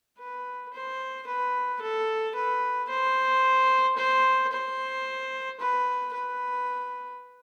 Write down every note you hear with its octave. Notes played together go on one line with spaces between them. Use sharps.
B4
C5
B4
A4
B4
C5
C5
C5
B4
B4